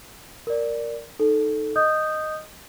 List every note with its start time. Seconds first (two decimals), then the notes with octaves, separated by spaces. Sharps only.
0.47 A#4 D5
1.19 D#4 A4
1.76 D#5 D#6 G6